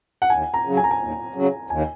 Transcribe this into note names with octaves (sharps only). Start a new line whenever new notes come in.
F#5
D#2 G#5
A#5
C#3 F#3
G#5
A#5
G#5
D#2
C#3 F#3
D#2 G#5